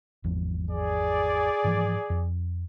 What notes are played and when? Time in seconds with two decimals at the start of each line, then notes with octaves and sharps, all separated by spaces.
0.24 G#1 E2 F3
0.70 G#4 D5
1.64 G#2 E3 F3
2.10 F2